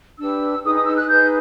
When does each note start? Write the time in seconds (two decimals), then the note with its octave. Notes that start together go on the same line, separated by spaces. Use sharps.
0.19 D4 G4 B4 E6
0.63 D#4 G#4 B4 D#6
0.74 D#6
0.85 E6
0.96 F#6
1.08 D#4 G#4 B4 G6